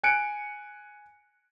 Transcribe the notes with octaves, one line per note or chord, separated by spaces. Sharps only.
G#5 F#6 C#7 D7